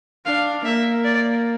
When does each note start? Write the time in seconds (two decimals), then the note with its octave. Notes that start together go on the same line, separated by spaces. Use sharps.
0.25 D4 F5
0.64 A#3 E5
1.05 D5